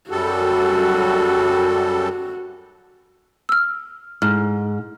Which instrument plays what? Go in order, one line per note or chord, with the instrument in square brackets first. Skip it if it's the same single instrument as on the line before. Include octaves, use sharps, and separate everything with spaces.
[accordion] F#2 G3 A4 [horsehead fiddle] F#4
[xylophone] E6 F6
[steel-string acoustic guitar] G#2 [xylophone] F6